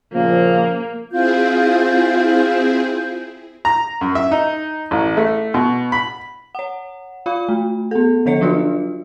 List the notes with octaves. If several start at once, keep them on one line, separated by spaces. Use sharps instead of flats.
A#2 C#3 F3 A#3
C4 E4 F4 G#4 G6
A#5
F#2
E5
D#4
A1
A3
B2
B5
C#5 F#5
F4 F5 B5
A3
B3 A4
D3 F3 A4 C#5 C#7
F#3 D4 F4 F#4 D#5